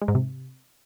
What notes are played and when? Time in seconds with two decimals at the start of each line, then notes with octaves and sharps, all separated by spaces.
0.02 G#3
0.08 G#2
0.15 C3